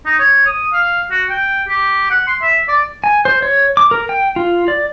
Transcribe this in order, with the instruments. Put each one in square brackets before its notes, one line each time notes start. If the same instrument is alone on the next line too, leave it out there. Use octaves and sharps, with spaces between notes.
[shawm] D#4
C#5
D#6
F5
F#4
G5
G4
F#5
C6
E5
D5
[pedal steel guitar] G#5
C5
C#5
D6
A#4
G5
F4
D5